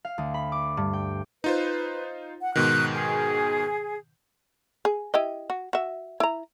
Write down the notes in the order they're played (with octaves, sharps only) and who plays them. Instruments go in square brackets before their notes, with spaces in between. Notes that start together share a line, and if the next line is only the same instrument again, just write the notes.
[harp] F5
D2
B5
D6
G2
G5
[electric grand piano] D#4 F4 C5 [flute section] B4
[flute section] F#5
[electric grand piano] G#2 B2 D#3 [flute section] F#6
[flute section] G#4
[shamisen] G#4
E4 G4 D#5
F#4
F#4 E5
E4 A#5